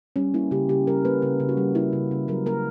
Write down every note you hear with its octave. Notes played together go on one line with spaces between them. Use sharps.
G3 C#4
A#3 E4
C#3 G4
C#3 G4
G3 A#4
A#3 B4
C#3 A#4
C#3
F#4
G3
A#3 E4
C#3
C#3
F#3 A#4
A#3 A#4